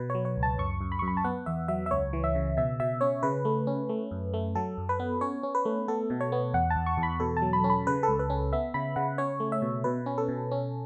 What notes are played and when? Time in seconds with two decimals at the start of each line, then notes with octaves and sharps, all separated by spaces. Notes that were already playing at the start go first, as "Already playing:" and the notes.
Already playing: B2 B4
0.10 C#5
0.15 F#3
0.25 C#5
0.37 C#2
0.43 A5
0.58 F#2 C#6
0.81 F#2
0.92 B5
0.99 C#6
1.02 F#2
1.08 B5
1.17 A5
1.24 B3 F#5
1.46 E2 E5
1.68 F#3 E5
1.86 E5
1.91 C#2 C#5
2.13 E3
2.24 E5
2.35 C#3
2.57 B2 E5
2.80 B2 E5
3.01 C#4 C#5
3.23 C#3 B4
3.45 A3
3.67 C#4
3.89 A3
4.11 F#2
4.34 A3
4.55 F#3 A4
4.78 F#2
4.89 B4
5.00 B3
5.21 C#4 C#5
5.43 C#4
5.55 B4
5.65 A3
5.88 B3 A4
6.10 B2
6.21 C#5
6.32 B3
6.54 E2 F#5
6.70 A5
6.76 E2
6.86 C#6
6.98 E2
7.03 B5
7.20 B2 A4
7.37 A5
7.42 F#3
7.53 B5
7.64 C#4
7.70 B5
7.87 C#3 B4
8.03 A4
8.08 C#2
8.19 B4
8.30 C#4
8.53 B3 E5
8.74 C#3 B5
8.96 C#3 F#5
9.18 C#4 C#5
9.40 A3
9.52 E5
9.62 B2
9.84 B2 B4
10.06 C#4
10.18 A4
10.28 B2
10.51 C#4